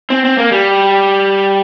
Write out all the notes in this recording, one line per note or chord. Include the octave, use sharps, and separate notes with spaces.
C4
C4
A#3
G3